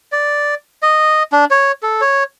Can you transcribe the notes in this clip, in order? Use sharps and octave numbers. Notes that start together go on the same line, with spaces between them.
D5
D#5
D4
C#5
A4
C#5